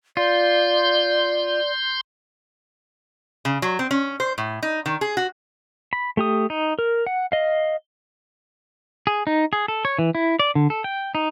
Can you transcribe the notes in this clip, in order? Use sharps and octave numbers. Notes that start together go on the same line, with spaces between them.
F4 D5 C6 G6
C#3
F#3
C4
C#4
C5
A2
D#4
D#3
G#4
F#4
B5
A3 G4 D#6
D#4
A#4
F#5
D#5 F5
G#4
D#4
G#4
A4
C#5
E3
E4
D5
D3
A4
G5
D#4